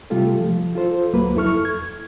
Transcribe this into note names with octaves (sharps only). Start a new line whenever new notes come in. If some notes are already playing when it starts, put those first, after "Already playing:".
C3 G3 A3 F4 G4 A4
F3
F4 A4 C5
C#2 F#3 A#3 B4
F2 E4 A4 C#6 F6
G#6